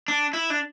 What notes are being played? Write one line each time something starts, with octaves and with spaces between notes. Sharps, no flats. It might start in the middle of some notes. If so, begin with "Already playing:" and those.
D4
E4
D4